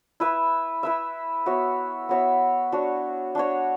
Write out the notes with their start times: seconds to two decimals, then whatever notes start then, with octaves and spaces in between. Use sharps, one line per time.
0.20 E4 B4 E5
0.83 E4 B4 E5
1.46 B3 F#4 C#5 E5
2.09 B3 F#4 C#5 E5
2.72 D4 F#4 C#5
3.35 D4 F#4 C#5